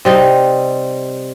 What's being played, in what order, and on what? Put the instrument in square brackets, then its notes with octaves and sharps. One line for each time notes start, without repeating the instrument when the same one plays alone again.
[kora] C3 G3 D#4